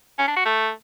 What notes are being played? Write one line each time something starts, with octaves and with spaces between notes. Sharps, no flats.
C#4
D4
F#4
A3